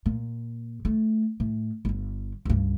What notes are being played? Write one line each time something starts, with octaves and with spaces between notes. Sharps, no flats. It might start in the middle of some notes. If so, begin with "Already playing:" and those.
A#2
A3
A2
G1 D3
C#2 G2